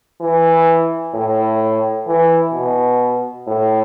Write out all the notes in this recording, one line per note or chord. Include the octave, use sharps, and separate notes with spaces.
E3
A2
E3
B2
A2